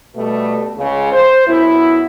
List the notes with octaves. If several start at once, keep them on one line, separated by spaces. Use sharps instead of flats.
B2 G3 A3
C#2 C#3
C5
F#2 B3 E4